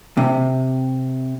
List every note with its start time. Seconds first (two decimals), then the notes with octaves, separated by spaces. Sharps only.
0.17 C3